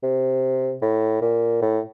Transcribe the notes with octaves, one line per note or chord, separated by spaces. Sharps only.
C3
A2
A#2
A2